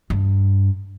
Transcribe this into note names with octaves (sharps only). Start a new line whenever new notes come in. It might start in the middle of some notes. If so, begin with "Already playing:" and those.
G2